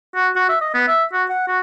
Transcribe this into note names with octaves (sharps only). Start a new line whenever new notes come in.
F#4
F#4
E5
D#5
B3
E5
F#4
F#5
F#4